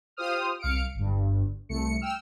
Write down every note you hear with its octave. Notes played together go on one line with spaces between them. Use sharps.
F4 G4 C5 D#6 F6
C2 F5 C#7 D7
G1 G2
C2 A3 C#7
G5 E6 F6